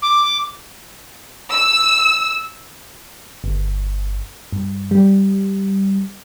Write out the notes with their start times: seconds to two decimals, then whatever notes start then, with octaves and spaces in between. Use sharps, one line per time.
0.02 D6
1.53 E6
3.44 G1
4.52 G2
4.91 G3